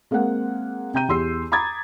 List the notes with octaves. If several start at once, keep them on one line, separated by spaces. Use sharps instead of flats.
G#3 A#3 C4 G#4 F#5
C3 G5 A#5 G6 D#7
E2 G4 C6 E6 C7
A#5 B5 D6 D#6 G#6 A6